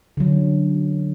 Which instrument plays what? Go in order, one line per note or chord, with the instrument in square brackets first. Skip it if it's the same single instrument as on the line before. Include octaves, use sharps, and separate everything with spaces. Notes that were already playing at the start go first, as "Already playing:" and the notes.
[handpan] D3 F#3